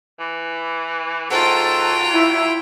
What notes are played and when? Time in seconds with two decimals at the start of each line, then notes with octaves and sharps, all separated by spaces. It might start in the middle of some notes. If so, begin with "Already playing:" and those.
0.19 E3
1.30 G#2 F#3 F4 A4 G5 A5
2.13 E4